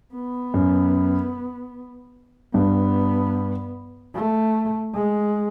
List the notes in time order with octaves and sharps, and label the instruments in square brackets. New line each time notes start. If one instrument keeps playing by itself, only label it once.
[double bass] B3
[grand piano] F#2
[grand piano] G2 [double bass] B3
[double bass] A3
G#3